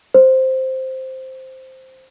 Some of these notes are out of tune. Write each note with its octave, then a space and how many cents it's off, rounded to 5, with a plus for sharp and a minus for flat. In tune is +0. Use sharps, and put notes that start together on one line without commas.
C5 +0